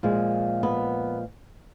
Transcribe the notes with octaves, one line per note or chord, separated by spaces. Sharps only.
A#2 F3 G#3
B3